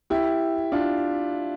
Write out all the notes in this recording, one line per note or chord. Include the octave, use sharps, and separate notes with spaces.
E4 G4
D4 F4